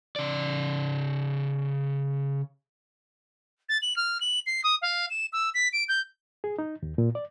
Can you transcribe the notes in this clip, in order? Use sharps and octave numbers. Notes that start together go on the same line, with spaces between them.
C#3 D5
A6
F#7
F6
F#7
C7
D#6
F5
E7
E6
B6
D7
G6
G#4
D#4
D#2
A#2
D5